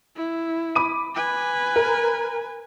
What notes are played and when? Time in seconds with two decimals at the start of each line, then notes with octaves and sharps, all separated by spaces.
0.16 E4
0.75 B5 D6 D#7
1.15 B4 G#5
1.76 A#4